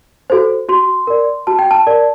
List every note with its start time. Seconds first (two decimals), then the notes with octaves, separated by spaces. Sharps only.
0.30 F#4 A4 C5
0.69 F#4 C6
1.07 A#4 D5
1.47 F#4 A5
1.59 G5
1.71 A5
1.87 A#4 D5